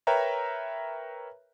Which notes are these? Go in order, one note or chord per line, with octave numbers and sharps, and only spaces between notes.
A#4 B4 C#5 E5 G5 A#5